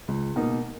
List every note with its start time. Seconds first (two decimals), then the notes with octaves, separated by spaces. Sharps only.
0.08 C#2
0.36 B2 A#3 D#4